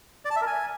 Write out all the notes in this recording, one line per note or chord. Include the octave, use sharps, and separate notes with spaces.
D5
A5
E5
A#4
G#5